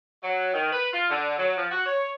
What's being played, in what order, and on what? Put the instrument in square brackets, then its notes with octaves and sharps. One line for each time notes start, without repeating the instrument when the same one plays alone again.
[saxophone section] F#3
D#3
B4
F4
D3
F#3
F3
F#4
C#5